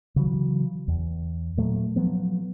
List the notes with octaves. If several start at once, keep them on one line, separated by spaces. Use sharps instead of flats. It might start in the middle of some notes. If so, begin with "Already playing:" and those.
C#3 E3 F#3
E2
A#2 F#3 A3
F3 F#3 B3